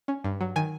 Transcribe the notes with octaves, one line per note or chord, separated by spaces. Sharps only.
C#4
G2
F#3
D#3 G#5